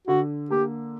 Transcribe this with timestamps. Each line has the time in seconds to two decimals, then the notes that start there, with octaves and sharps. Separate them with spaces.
0.07 D3 F#4
0.51 A#3 G4